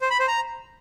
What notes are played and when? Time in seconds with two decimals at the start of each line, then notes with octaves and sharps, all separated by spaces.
0.02 C5
0.10 B5
0.19 C5
0.28 A#5